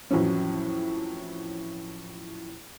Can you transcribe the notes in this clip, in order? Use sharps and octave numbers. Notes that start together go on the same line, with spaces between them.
F2 A2 E3 F#3 C#4